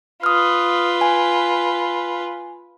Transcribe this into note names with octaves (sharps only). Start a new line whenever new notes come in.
F4 B4 D#6 F6
G#5